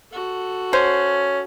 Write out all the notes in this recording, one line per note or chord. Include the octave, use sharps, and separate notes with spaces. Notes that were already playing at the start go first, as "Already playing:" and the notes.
F#4 A4
C#4 C5